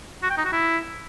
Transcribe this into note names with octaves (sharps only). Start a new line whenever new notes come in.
F#4
G5
D#4
F#4
E4